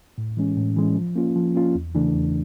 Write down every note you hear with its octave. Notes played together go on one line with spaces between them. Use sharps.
A2
E3 G#3 C#4
A2
E3 G#3 C#4
F3
A#3 C#4 F4
F3
A#3 C#4 F4
E2
C#3 E3 A3 D4
E2